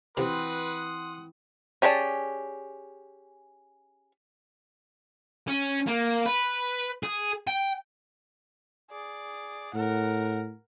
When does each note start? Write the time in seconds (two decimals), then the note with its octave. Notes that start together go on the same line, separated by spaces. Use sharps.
0.17 C3 E3 C4 F#4 B4 F#5 C6 D#6
1.82 C#4 G4 G#4 D5 A5
5.48 C#4
5.88 A#3
6.26 B4
7.03 G#4
7.47 G5
8.91 G#4 D5
9.74 A2 A#4 F#5